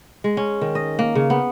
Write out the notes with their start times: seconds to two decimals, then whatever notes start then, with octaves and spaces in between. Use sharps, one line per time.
0.24 G#3
0.37 C#4
0.61 D#3
0.75 D#5
0.99 A#3
1.15 C#3
1.30 B3